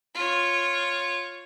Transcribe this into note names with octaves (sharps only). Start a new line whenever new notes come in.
F4 C#5